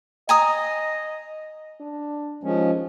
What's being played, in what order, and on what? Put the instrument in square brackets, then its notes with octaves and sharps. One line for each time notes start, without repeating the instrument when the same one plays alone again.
[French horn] D#5 [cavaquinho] G#5 A#5 D#6
[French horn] D4
[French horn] D#2 [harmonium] F3 G#3 C#4